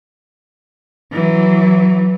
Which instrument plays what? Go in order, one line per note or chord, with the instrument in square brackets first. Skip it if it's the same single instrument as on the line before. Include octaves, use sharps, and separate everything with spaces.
[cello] E3 F#3